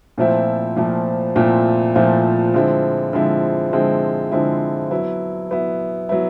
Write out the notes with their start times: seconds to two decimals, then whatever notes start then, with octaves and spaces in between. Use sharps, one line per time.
0.18 A#2 F3 A3 C4 E4
0.76 A#2 F3 A3 C4 E4
1.36 A#2 F3 A3 C4 E4
1.95 A#2 F3 A3 C4 E4
2.54 D3 F3 G#3 C4 E4
3.13 D3 F3 G#3 C4 E4
3.73 D3 F3 G#3 C4 E4
4.32 D3 F3 G#3 C4 E4
4.91 F#3 B3 E4
5.50 F#3 B3 E4
6.09 F#3 B3 E4